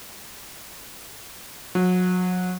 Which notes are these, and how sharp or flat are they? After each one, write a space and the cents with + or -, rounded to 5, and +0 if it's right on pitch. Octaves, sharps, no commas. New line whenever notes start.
F#3 -30